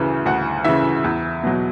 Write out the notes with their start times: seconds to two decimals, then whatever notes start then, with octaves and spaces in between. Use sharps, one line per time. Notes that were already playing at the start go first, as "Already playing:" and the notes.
Already playing: D2 C#3 E3
0.26 D2 F#5
0.64 C#3 E3 E5
1.04 E2
1.43 B2 F#3